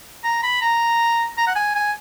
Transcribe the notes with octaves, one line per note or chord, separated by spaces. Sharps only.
A#5
B5
A#5
A#5
F#5
G#5
G#5